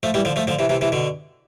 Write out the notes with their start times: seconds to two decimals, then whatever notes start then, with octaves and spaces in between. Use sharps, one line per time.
0.03 F3 A3
0.14 E3 G3
0.25 D3 F3
0.36 F3 A3
0.47 D3 F3
0.59 C3 E3
0.69 C3 E3
0.81 C3 E3
0.92 B2 D3